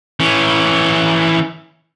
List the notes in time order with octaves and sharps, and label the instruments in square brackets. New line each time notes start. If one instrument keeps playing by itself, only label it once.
[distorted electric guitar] E3 C#4